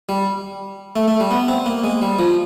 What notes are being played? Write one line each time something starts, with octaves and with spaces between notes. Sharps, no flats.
G3
A3
A3
G3
B3
C4
A#3
G#3
G3
F3